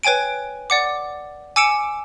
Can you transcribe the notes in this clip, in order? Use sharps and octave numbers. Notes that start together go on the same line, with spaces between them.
B4 C#5 G5 G#5 D7
D5 F#5 D6
G#5 D6 E6 C#7 D7 E7